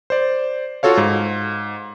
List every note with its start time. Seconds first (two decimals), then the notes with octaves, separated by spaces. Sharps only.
0.10 C5 D5
0.83 F4 F#4 A4 C#5 F5
0.97 G#2 F5